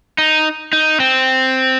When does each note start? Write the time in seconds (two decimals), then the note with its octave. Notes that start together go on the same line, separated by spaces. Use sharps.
0.18 D#4
0.73 D#4
1.00 C4